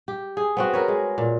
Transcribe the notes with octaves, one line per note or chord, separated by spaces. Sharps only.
G4
G#4
B3 C4 F#4
A#4 B4 C#5
G#3
A#2